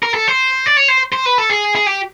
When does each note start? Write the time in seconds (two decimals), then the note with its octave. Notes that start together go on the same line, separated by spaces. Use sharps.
0.03 A#4
0.14 A4
0.28 C5
0.66 D5
0.77 C#5
0.88 C5
1.13 C5
1.26 B4
1.38 A4
1.50 G#4
1.76 G#4
1.86 G4